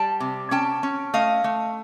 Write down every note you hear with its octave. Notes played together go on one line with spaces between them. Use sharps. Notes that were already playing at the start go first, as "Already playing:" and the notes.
Already playing: G3 G5 A5
C3
C#4 G5 A5
C#4
A3 D#5 F5
A3